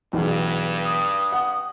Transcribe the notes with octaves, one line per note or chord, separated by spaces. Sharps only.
B1 E2 G2 G#4
D#6
F#5